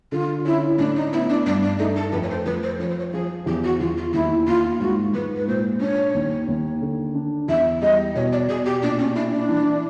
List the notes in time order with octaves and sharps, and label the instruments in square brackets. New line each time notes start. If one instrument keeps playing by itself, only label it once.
[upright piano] D3 [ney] F4
[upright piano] C#4 [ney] E4
[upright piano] A2 [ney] D4
[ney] D#4
[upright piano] B3 [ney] E4
[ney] D4
[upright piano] G2 [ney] D4
[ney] D4
[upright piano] A3 [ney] D#4
[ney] A4
[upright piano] F2 [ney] B4
[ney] C#5
C5
[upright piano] F2 [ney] B4
[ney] C5
[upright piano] F3 [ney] C#5
[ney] C5
C#5
[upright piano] F3 [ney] G#4
[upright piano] E2 [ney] G4
[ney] F#4
[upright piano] E2 [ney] F4
[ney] F4
[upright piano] D#2 [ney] E4
[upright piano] D#2 [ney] F4
[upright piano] G#2 [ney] F#4
[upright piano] G#2 [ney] B4
[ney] B4
[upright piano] A#2 [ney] C5
[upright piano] D4 [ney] C#5
[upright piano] D#2
D#2
D3
D4
[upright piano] E2 [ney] E5
[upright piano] G3 [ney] D#5
[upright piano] B2 [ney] C#5
[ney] D5
[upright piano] B2 [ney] G#4
[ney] G4
[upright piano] A#2 [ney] D4
[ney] C#4
[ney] D4 [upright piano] E4
[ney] D4
[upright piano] E3